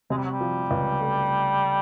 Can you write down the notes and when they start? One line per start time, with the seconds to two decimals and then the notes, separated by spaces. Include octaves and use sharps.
0.10 C3 G#3
0.17 G3
0.24 F#3
0.31 G3
0.41 F3
0.71 C#2
1.01 A3